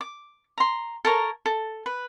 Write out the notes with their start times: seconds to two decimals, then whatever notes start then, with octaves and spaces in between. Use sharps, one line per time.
0.01 D6
0.58 A#5 C6
1.05 A4 A#4 C#5 A#5
1.46 A4
1.86 B4